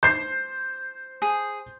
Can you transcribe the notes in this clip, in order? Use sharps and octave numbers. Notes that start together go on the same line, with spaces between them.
C5 G6 C7
G#4